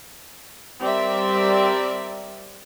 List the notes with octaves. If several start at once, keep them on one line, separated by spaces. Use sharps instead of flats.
G3 C4 G4 A#4 D5 E5